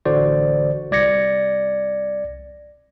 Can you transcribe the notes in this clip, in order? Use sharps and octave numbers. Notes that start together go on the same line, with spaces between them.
A1 D3 F#4 C5 D5
C2 D5 G#6 A#6 C#7